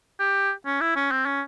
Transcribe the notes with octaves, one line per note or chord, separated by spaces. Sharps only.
G4
C#4
E4
C#4
C4
C#4